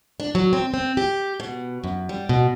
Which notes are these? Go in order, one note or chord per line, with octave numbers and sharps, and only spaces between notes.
D4
F#3
C4
C4
G4
B2
F#2
G3
B2